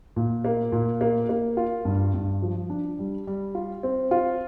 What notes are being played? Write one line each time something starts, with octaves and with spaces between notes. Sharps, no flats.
A#2
A#3
A#2
A#3
A#3
F4
G2
G2
F3
D4
G3
G3
F4
C4
F4